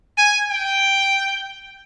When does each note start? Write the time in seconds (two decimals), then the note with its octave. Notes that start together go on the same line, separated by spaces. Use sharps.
0.17 G#5
0.50 G5